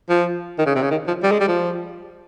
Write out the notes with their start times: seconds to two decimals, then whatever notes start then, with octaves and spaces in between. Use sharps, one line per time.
0.09 F3
0.59 D#3
0.66 C#3
0.75 C3
0.82 C#3
0.91 D#3
1.08 F3
1.23 G3
1.32 G#3
1.40 G3
1.48 F3